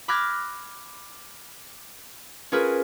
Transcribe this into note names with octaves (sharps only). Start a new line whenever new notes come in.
B5 D6 F6 F#6 G#6 A#6
C#4 F4 G#4 A#4 B4